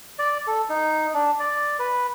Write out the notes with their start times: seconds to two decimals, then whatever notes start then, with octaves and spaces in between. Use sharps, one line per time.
0.19 D5
0.47 A4
0.69 D#4
1.14 D4
1.40 D5
1.79 B4